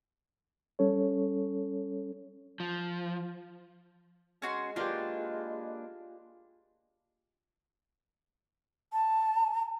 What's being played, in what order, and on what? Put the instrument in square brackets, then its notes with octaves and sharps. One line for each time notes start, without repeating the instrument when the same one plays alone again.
[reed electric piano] G3 C#4 A4 C#5
[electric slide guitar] F3
[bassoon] G#3 [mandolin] C#4 F#4 C6
[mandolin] A#3 D4 B4 [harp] F4 G4
[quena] A5